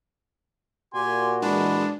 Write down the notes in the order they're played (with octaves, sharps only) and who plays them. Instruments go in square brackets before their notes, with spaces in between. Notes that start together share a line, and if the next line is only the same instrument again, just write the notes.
[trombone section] A#2 F#4 [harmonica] G4 G#5 C6
[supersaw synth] E3 G#3 [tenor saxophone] D4 [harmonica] B4